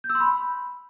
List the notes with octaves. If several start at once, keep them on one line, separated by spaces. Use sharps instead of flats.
G6
E6
C6
B5